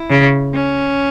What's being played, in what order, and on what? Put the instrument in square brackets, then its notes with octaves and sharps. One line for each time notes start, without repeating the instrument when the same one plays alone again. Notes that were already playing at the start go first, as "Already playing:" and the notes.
Already playing: [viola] E4
[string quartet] C#3
[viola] C#4